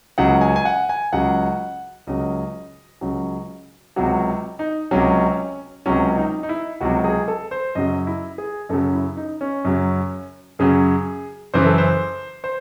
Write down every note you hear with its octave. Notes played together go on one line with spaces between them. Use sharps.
C#2 C#3 F#3 F#5
G#5
G#5
F#5
G#5
C#2 C#3 F#3 F#5
C#2 C#3 F#3 D#5
C#2 C#3 F#3
C#2 C3 F#3 F#4
D#4
C#2 C3 F#3 C#4
C#2 C3 F#3 C#4
D#4
D#4
E4
C#2 C3 F#3 F#4
G#4
A4
C5
F#2 C#3 F#3 D#5
E4
G#4
F#2 C#3 F#3 A4
E4
D#4
C#4
F#2 C#3 F#3
F#2 C#3 F#3 G#4
F#2 C#3 E3 C5
A4
C5
C5